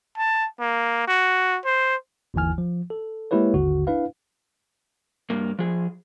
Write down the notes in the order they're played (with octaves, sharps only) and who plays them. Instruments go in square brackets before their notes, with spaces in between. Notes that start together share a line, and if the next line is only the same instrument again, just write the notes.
[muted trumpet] A5
A#3
F#4
C5
[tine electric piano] G1 D#2 E3 E4 G#5 F6
F3
A4
G#3 A#3 E4 G4 B4 C#5
G#1 D#2 D3 F#4
D4 E4 B4 F5
[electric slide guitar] G2 A#3
F3 G#4